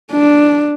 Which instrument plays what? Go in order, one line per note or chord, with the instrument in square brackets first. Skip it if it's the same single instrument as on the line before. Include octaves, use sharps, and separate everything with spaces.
[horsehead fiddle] D4